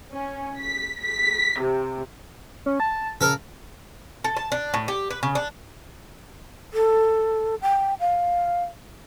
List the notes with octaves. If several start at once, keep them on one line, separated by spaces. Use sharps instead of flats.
C#4
B6
B6
C3
C#4
A5
C#3 A4 A#4
A4
A5
D4
A2
G4
B4
C#3
D4
A4
G5
F5